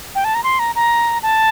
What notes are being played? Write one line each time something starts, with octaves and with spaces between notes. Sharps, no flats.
G5
A5
A#5
C6
A#5
A#5
A5